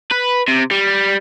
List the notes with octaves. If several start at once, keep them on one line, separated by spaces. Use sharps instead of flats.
B4
C3
G3